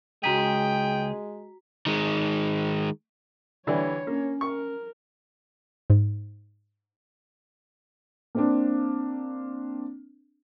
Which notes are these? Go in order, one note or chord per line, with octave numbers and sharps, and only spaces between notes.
C#2 G#3 F#4 G#4 G5 A#5 B6
D#3 G#3
D3 E3 G3 D4 C#5
A#3 C#4
A#4 C#6
G#2
A#3 C4 D4